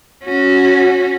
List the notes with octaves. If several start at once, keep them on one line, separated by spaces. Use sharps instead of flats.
C#4 F#4